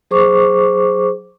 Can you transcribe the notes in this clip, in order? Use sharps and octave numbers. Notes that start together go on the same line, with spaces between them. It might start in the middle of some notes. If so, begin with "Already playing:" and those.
F#3 G#4 C5 C#6 D6